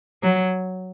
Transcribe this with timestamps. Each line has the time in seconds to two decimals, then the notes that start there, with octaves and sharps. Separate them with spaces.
0.23 F#3